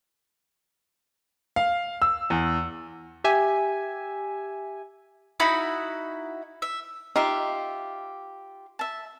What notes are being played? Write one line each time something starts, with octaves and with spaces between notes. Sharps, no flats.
F5
E6
E2
G4 E5 G#5
D#4 E4 F#4 B5
E5
D#4 F4 G4 E5
E5 A5